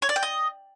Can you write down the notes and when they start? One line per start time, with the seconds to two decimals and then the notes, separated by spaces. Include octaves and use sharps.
0.02 C#5
0.09 D5
0.16 G5
0.23 D#5